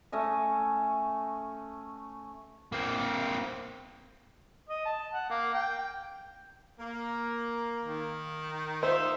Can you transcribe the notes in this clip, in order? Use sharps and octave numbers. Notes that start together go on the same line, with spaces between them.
A3 C#4 D#5
A#3 C4
D#5
A5
F#5
A#3
G5
G5
A#3
D#3
D#4 F4 C5 E5